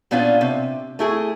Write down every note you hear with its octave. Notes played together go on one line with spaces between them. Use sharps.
A#2 B3 C#4 D4 F4
C3
A3 E4 G#4